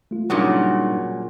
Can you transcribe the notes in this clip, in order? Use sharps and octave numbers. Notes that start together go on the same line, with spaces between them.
A3 F4
A#2 C#3 F#3 G3 D4 D#4